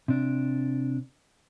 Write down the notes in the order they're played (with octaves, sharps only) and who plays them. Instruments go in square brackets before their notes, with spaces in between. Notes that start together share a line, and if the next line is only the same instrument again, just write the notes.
[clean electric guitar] C3 D4